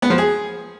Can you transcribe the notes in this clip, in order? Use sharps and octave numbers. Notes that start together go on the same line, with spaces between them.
B3
F3
G#4